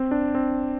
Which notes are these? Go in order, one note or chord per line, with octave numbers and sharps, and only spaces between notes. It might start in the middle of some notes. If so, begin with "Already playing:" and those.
Already playing: C4
D4
C4